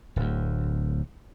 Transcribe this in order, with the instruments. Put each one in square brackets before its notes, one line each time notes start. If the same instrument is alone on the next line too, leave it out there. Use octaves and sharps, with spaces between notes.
[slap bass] D1 D2